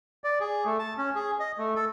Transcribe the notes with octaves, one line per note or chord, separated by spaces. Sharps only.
D5
G#4
A3
A5
C#4
G#4
D#5
A3
A4